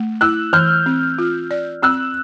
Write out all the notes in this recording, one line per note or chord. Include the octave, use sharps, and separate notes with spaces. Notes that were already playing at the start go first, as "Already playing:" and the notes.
Already playing: A3
E4 E6 F#6
E3 F6 G6
C4
F4
D5
C4 E6 F#6